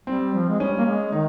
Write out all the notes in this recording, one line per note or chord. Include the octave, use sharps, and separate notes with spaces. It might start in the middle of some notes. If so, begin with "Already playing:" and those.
G3 C4
F3
G#3
G3 C#4
A#3
G#3
D#3 D#4